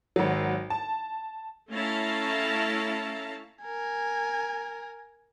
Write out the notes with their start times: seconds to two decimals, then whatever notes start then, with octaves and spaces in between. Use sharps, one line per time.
0.16 G#1 F#3
0.70 A5
1.72 A3 C#4 E4 F5 A5 A#5
3.63 A#4 G#5